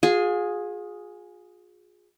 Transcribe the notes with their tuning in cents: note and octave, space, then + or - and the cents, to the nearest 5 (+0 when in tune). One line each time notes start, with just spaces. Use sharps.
F4 +40 G#4 +0